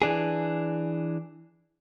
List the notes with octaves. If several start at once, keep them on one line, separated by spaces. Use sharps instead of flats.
E3 D4 G#4